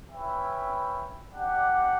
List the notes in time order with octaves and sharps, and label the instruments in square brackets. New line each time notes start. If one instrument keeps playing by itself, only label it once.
[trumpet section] C#4 E4 B4 E5 G5
D4 G4 D5 F#5